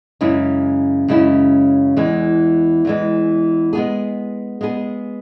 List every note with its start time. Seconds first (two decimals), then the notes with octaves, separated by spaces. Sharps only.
0.21 F#2 C#3 G#3 C#4 E4
1.08 F#2 C#3 G#3 C#4 E4
1.97 E2 E3 G#3
2.85 E2 E3 G#3
3.73 G#3 B3 G#4
4.61 G#3 B3 G#4